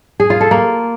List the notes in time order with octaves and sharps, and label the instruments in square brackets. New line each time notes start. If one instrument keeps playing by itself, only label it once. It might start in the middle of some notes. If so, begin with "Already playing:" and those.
[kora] G#4
F4
A4
A#3